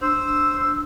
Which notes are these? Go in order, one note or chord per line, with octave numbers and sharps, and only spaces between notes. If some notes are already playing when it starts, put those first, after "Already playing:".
D4 C5 E6